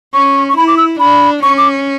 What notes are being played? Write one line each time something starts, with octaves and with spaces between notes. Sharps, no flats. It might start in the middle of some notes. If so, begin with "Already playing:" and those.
C#4 C#6
C#6
E4 B5
D6
E6
D4 B5
C#4 C#6
D6